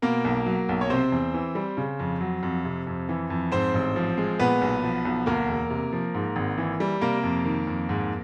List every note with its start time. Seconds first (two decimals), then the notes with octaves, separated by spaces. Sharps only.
0.02 B2 A#3 A#4
0.25 B1
0.46 F#3
0.69 B1
0.81 C#5
0.90 C3 C4 C5
1.12 E2
1.34 E3
1.55 G3
1.77 C#3
1.99 F2
2.21 F#3
2.43 F2
2.65 C3
2.87 F2
3.09 E3
3.30 F2
3.52 G#2 C4 C5
3.74 A1
3.96 F3
4.18 G#3
4.39 A#2 B3 B4
4.61 B1
4.83 F3
5.05 B1
5.26 D2 A#3 A#4
5.48 E1
5.70 C3
5.93 F3
6.14 G#2
6.36 G#1
6.58 E3
6.80 G3
7.01 C3 A#3 A#4
7.23 F2
7.45 D#3
7.67 F2
7.89 G#2